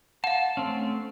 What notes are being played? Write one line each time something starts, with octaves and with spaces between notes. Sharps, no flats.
F5 F#5 A5
A3 C4 C#4